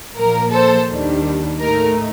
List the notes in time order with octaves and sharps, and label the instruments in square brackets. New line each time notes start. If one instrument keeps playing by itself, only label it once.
[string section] A#2 F3 A#3 A#4
A4 C5
D#2 D#3 G3 D4
A2 A3 D#4 A#4